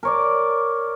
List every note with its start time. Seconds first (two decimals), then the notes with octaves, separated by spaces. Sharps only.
0.03 A#4 C#5 D5